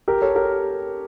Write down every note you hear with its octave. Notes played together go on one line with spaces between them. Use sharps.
G4 A#4
A4 C#5
G4 A#4